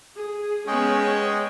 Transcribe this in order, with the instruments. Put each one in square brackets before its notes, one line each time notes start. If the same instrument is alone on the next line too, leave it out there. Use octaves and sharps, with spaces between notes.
[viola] G#4
[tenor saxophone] G#3 [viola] B3 C#4 [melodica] G#4 G5 C#6